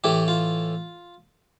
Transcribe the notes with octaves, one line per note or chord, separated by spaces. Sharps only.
A2 E3 A3 G4
F4